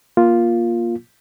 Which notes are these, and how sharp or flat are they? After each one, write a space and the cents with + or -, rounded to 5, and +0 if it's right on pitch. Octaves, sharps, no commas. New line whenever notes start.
A#3 +15 F4 +0